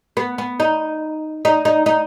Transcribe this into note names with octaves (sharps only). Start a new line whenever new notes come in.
B3
B3
D#4
D#4
D#4
D#4